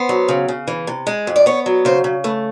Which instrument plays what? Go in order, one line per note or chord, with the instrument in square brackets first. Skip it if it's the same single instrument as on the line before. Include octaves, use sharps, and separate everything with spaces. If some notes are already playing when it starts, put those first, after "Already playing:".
Already playing: [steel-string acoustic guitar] B3 C5
F#3
C#3
C#3
E3
C3
G#3
F2
D5
B3 C#5
F#3
C#3 C5
C#3
A3 B4